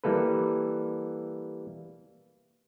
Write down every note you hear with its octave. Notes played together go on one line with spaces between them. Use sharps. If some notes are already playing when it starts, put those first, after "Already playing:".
E3 G3 A#3 A4 B4